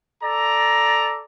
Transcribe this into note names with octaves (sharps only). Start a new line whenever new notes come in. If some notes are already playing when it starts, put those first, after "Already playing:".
A4 D5 A#5